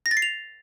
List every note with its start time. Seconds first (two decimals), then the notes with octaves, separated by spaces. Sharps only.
0.06 A#6
0.11 A6
0.17 C7
0.22 F7